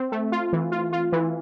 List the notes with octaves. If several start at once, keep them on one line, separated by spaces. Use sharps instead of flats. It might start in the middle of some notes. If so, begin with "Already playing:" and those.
Already playing: C4
A3
F4
E3
F4
F4
E3